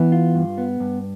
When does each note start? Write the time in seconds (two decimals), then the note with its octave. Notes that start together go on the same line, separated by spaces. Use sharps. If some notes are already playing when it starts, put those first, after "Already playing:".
Already playing: E3 B3
0.12 F4
0.35 G2
0.58 B3
0.80 G2